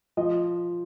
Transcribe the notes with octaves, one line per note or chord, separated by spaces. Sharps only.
F3 D#5